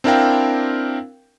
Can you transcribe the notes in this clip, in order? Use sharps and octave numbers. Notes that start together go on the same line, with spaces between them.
C4 D4 E4 A#4 F5 G5